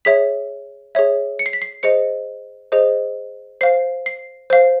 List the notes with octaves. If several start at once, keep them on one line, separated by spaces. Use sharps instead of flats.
G#4 C#5 E5 B6
G#4 C#5 E5
C#7
C7
B6
C7
G#4 C5 D#5 C#7
G#4 C5 D#5
C5 F5 C7
C7
C5 F5